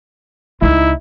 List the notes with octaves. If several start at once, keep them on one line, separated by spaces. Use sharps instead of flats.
C#2 D#4 E4